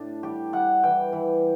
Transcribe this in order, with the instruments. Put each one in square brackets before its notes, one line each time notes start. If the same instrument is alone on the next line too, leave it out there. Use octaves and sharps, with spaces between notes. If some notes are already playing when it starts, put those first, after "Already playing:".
Already playing: [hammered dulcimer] A2 D4
G3 G4
G3 F#5
E3 G5
E3